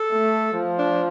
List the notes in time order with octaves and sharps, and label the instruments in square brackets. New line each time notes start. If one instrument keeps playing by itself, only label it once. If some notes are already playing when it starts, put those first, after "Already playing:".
Already playing: [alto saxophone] A4
[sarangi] A3
F3
[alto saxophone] D4